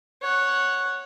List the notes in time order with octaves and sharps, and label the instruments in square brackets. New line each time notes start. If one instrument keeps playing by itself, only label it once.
[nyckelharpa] C#5 F#5